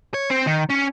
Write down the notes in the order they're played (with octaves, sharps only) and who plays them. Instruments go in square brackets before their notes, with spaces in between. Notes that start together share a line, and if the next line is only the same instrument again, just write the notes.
[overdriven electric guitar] C#5
C4
D#3
C#4